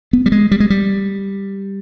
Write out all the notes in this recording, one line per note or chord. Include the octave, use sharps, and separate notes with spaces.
B3
G3
G#3
G3
G#3
G3